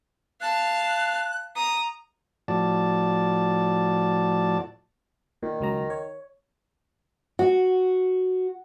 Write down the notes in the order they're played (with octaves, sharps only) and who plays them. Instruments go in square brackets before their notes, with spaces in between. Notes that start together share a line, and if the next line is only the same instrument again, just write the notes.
[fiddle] F5 A5 [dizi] F#6
[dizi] A#5 [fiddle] D#6
[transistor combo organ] A2 F3 F#4 D5 A5
[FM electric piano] A#2 [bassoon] D#3
[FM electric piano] C#2 F#3 A#5
C#5
[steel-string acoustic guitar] F#4